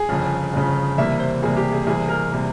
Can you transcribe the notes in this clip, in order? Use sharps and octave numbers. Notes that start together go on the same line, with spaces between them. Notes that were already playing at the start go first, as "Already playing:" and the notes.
Already playing: G#4
G1 F2 C#3
G1 F2 C#3
E2 C3 G3 A#3 E5
C5
E2 C3 G3 A#3 G#4
G4
G#4
E2 C3 G3 A#3 G#4
A#4
C3 G3 A#3